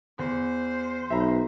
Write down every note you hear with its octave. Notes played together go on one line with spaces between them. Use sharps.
E2 C5
B1 E5 A#5 B5